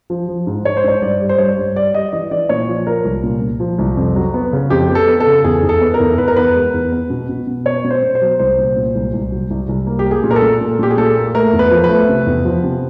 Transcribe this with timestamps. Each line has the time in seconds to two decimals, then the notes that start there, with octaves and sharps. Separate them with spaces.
0.10 F3
0.29 F3
0.47 G#2
0.65 G#2 C#5
0.77 C5
0.84 G#2 C#5
1.02 G2 D5
1.20 G3
1.29 C5
1.38 G2 C#5
1.58 G2
1.76 G3 D5
1.94 G3 D#5
2.13 E3 D#5
2.31 E3 D5
2.49 A#2 C#5
2.68 F3
2.87 F3 A#4
3.05 C2
3.24 A#2
3.41 A#2
3.60 F3
3.79 C2
3.97 F2
4.16 F#3
4.34 B3
4.53 C#3
4.70 F2 G4
4.89 B3
4.95 A4
5.08 B3
5.20 A4
5.26 C#3
5.44 E2 G#4
5.63 E2
5.69 A4
5.81 B3
5.94 A#4
6.00 E2
6.18 E2 B4
6.28 A#4
6.36 E2 B4
6.55 G#3
6.74 E2
6.92 B3
7.10 B2
7.29 B2
7.47 B2
7.66 B3 C#5
7.84 B2
7.90 C5
8.03 B2
8.15 C5
8.22 F#3
8.39 C2 C5
8.58 A#2
8.76 A#2
8.95 C2
9.13 C2
9.32 F#3
9.50 C2
9.69 C2
9.87 A#3
9.99 G4
10.06 A#3
10.11 G#4
10.24 A#2
10.31 A#4
10.36 A4
10.42 A#2
10.61 A#2
10.79 A#2 G4
10.91 G#4
10.98 A#2 A4
11.17 A#3
11.34 A3 A#4
11.53 E2
11.59 B4
11.71 F3
11.84 B4
11.89 A3
12.09 C3
12.26 E2
12.45 F3
12.63 C3